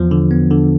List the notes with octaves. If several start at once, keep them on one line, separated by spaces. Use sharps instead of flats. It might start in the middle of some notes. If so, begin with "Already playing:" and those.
Already playing: E2 F3
D3
B3
D3